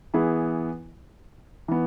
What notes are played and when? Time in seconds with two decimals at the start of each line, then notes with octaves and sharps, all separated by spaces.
0.14 E3 B3 E4 G#4
1.68 E3 B3